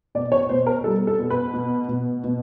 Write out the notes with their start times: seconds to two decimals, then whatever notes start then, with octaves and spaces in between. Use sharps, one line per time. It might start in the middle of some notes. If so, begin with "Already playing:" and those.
0.15 B2 D5
0.32 C#5
0.49 B2 C5
0.67 A#4
0.84 G3 A4
1.07 A4
1.19 B2
1.30 B4
1.54 B2
1.88 B2
2.24 B2